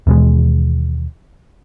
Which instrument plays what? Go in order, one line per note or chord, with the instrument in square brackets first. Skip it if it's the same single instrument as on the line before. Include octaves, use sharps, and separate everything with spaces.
[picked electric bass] D#2 B2 E3 G#3